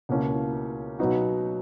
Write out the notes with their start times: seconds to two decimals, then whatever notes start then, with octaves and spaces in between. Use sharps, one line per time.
0.09 C#2 B2 A#3 C#4 E4
0.99 B2 F#3 B3 D#4 F#4